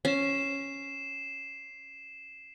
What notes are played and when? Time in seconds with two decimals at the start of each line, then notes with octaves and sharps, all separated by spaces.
0.05 C#4 C7 E7